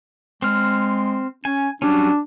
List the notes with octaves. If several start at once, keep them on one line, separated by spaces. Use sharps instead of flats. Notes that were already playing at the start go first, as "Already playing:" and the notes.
G#3 C4 F6
C#4 G#5
F#3 G3 C#4 D4